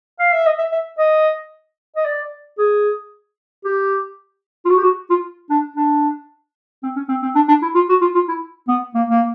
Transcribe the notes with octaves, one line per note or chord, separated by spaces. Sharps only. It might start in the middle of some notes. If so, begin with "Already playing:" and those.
F5
E5
D#5
E5
E5
D#5
D#5
D5
G#4
G4
F4
F#4
G4
F#4
F4
D4
D4
C4
C#4
C4
C4
D4
D4
E4
F4
F#4
F4
F4
E4
B3
A#3
A#3